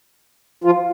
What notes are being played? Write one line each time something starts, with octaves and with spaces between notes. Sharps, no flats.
F3 F4 F5